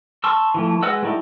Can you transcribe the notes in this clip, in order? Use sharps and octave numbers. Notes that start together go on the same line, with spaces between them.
A5 C6 C#6 E6
E3 F3 A3
G#3 B4 D#5 F#5 E6
G3 A3 D#4 E4 G4